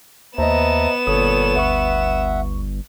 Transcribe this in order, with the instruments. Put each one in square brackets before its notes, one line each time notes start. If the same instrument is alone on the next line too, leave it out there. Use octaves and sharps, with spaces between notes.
[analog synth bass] D#2 [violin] B3 E7 [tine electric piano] C5 D#5 [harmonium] E5 A5 A#5
[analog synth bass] G1 [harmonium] A#2 A4 C#5 [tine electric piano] D#6
[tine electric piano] D2 C#6 [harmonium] E5 F#5